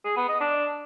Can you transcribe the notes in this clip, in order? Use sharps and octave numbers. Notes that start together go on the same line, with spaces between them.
G#4
B3
D#5
D4